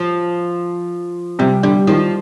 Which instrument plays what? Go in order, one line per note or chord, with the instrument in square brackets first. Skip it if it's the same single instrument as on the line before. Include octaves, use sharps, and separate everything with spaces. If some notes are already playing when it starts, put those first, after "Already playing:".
Already playing: [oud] F3
[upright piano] C3 [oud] G3
[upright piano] D3 [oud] G3
[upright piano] D#3 [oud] F3